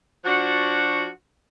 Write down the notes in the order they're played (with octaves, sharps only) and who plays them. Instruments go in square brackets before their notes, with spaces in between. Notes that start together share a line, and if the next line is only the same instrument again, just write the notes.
[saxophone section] F3 D4 F#4